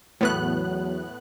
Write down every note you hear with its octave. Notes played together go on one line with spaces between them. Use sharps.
E2 A2 F#3 B3 F#6